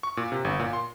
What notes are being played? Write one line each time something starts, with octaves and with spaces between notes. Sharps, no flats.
C#6
A#2
C3
G1
A#2
C6